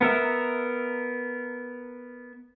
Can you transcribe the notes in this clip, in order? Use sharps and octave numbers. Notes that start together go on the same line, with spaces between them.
B3 A#4 E5